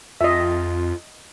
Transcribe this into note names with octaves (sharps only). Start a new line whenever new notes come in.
F2 F4 D#5 E5